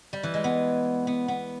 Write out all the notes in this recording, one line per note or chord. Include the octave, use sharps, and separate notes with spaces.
G3
E3
G#3
B3
B3
B3